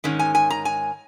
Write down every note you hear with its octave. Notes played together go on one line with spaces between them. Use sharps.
G#2 D#3 G#3 C#4
G#5
G#5
A#5
G#5